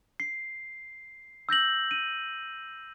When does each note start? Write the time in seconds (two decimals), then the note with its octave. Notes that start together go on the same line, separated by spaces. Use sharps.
0.20 C7
1.49 E6 G6 A#6 F#7
1.91 D#7